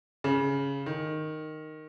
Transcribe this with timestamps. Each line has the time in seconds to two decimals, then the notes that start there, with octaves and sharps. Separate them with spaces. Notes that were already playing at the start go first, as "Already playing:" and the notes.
0.24 C#3
0.86 D#3